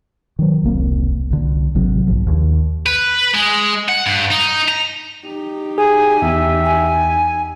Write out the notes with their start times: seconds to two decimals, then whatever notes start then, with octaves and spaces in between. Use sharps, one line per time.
0.39 D#3 F#3
0.63 E1 C2 A#3 C4
1.30 C2 D3
1.75 G#1 C3 F#3 C4
2.07 B1 G#2 F3
2.27 D#2
2.86 B4
3.35 G#3
3.89 F#5
4.06 G2
4.31 D#4
4.69 A#5
5.26 D#4 G4
5.78 G#4 G#5
6.22 E2 E5
6.65 G#5